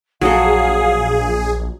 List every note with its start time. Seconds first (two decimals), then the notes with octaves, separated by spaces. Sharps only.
0.21 A#1 F#3 G#4 A4 F5 D#6